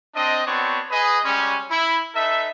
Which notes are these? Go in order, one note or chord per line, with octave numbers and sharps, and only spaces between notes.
C4 D4 D#5
B3 C4 D4 F#4 C#5
G#4 B4 D#5
G3 G#3 C#4
E4
D#4 A4 B4 E5